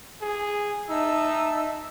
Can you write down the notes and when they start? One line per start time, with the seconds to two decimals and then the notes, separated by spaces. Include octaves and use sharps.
0.22 G#4
0.89 D#4 E5 A5 E6